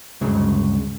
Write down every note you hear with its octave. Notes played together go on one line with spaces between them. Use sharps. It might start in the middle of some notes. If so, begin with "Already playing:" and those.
D2 G2 C#3 F#3 G#3